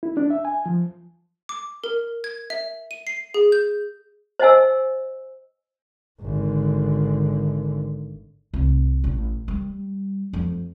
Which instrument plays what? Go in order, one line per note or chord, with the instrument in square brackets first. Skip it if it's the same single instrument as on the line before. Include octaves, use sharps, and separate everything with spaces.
[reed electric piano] E4
D4
E5
G#5
F3
[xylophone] D6
A#4
G#6
E5
D#7
C7
G#4
G6
[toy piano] C5 D#5 F#5 G#5 E6
[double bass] G#1 D3
[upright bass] C2
A1
G3
F2